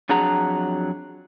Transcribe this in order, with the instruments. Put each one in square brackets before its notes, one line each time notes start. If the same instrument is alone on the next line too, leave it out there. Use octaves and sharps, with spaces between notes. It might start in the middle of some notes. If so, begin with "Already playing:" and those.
[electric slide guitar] F2 F#3 D4 G#4 F#5 A#5